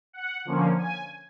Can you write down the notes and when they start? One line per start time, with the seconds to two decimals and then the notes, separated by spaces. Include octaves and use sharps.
0.13 F#5
0.45 D3 F3 A#3 C#4
0.77 G#5